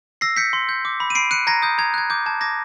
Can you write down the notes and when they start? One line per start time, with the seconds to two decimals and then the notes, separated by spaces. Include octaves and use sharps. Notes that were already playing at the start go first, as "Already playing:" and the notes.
0.21 E6 A#6 C7
0.37 G6 B6 C#7
0.53 C6
0.69 G6
0.85 D6
1.00 B5
1.10 D#7
1.15 B5 C7 D7
1.31 F#6 C#7 D#7
1.47 A#5 G#6 A#6
1.62 D#6 G6
1.78 A#5 G#6
1.94 F#6 G#6
2.10 D6 G6
2.26 A5 G#6
2.41 D6 G#6 A#6